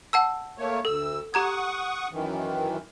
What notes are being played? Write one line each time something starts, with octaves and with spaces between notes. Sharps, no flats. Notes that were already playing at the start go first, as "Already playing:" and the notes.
F#5 A5 E6
A3 A#3 C#5
D2 A4 E6
G4 F#5 A#5 C#6 D#6 G#6
F#2 D#3 E3